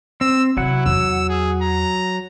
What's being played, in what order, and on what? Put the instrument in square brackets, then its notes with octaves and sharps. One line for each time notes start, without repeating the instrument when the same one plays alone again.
[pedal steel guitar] C4 [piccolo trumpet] E6
[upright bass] C3 [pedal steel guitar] F#3 F#5 [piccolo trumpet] E4
[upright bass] E2 E4 [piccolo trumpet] E6
[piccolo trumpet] G#4
A#5